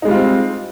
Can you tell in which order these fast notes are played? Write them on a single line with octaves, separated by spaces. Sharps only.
D#4 G#3 G3 F4 C4